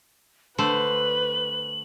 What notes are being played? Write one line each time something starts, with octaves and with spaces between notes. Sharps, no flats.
D3 A3 B4 C5 F#7